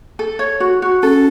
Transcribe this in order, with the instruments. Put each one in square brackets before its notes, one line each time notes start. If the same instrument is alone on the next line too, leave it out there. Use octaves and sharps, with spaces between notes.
[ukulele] A4
C#5
F#4
F#4
[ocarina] C#4 [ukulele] A4